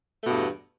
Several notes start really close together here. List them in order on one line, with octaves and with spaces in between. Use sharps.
A3 B2 G2 E2